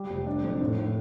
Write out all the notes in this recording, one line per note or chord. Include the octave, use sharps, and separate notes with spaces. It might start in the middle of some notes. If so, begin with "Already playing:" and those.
Already playing: G3
F1
D4
F2
A2
A2